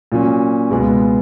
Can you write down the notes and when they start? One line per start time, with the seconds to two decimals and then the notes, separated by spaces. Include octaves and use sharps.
0.12 A#2 F#3 C#4
0.71 C#2 B2 G#3 B3